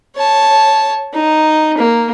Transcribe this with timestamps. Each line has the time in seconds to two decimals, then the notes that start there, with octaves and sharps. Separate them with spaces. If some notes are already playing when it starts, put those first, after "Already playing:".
0.16 C#5 A5
1.14 D#4
1.78 A#3